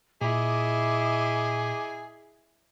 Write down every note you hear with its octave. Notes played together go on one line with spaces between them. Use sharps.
A#2 E4 G#4 D#5 D6